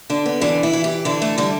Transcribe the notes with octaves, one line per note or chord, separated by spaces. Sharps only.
D3 D4
B3
E3 D4
E4
E3
G4
D3 E4
A3
D3 G3